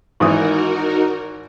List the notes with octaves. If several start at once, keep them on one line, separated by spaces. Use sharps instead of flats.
G#1 E3 D#4 F#4 A#4 D#6